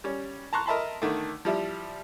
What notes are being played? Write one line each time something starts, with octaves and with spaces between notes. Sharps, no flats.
G3 C#4
A5 A#5 C6 C#6 F#6
A#4 D#5 E5 A5 B5 C6
D3 D#3 A3
F3 G3 E4